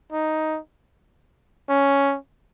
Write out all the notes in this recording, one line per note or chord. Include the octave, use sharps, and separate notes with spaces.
D#4
C#4